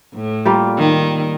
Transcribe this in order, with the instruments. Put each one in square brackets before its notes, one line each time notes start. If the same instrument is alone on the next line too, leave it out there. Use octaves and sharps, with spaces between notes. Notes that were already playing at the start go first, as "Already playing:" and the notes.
[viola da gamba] A2
[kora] G3 A#3 F4
[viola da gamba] D#3